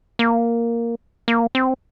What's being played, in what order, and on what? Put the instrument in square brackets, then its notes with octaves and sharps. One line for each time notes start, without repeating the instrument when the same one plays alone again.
[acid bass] A#3
A#3
C4